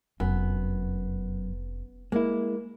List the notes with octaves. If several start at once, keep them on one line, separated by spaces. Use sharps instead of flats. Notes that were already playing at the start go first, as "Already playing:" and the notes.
F1 F#2 B3
G#3 A#3 E4